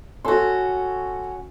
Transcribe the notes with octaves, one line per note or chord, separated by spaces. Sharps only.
C#4 F#4 A4 C6